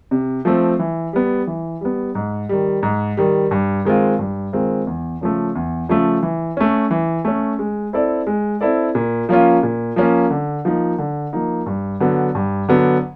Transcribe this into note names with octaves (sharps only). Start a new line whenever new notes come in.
C3
F3 A3 C4
E3
G3 B3
E3
G3 B3
G#2
D#3 G3
G#2
D#3 G3
G2
D#3 G#3 C4 F4
G2
D#3 G#3 C4 F4
E2
C#3 F3 A3
E2
C#3 F3 A3
E3
A3 C#4
E3
A3 C#4
G#3
C4 E4 A4 D5
G#3
C4 E4 A4 D5
A#2
F3 A#3 C#4 F4
A#2
F3 A#3 C#4 F4
D3
F3 A#3 D#4
D3
F3 A#3 D#4
G2
D3 F#3 B3
G2
D3 F#3 B3